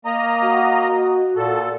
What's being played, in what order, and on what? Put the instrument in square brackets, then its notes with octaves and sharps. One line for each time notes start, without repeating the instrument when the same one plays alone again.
[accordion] A#3 D#5 A#5
[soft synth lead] F#4
[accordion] A#2 A4